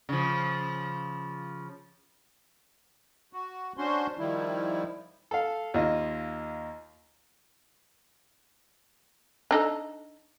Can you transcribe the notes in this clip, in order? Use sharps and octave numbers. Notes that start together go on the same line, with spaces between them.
C#3 F3
F#4
C#4 D4 F#4 C5 C6
D#3 F3 G3 E4
A4 F5
D#2 F4 D#5
D4 D#4 A4